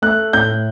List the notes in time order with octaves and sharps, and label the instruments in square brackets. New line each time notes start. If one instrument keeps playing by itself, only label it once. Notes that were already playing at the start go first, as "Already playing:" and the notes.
[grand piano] A3 F#6
A2 G6